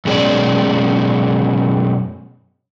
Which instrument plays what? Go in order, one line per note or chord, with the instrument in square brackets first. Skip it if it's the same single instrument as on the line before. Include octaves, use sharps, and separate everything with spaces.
[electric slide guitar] F#2 B2 G#3 C#4 D5